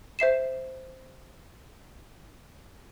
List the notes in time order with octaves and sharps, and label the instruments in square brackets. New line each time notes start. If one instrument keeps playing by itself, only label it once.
[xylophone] C5 E5 C7 E7